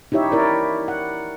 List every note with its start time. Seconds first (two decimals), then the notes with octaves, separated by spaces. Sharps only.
0.12 D#4 E4 G4 C#5 E5
0.32 E4 A#4 C#5 D5
0.88 F#5